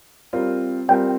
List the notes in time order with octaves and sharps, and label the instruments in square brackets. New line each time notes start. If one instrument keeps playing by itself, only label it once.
[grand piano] G3 C4 F4 A#4
[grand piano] G3 C4 F4 A#4 [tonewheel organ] G5